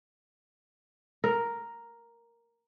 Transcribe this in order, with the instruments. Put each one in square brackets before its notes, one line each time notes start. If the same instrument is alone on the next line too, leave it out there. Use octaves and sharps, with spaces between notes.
[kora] A#4